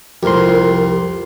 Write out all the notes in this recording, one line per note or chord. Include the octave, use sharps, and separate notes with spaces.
C2 F2 G4 A#4 C6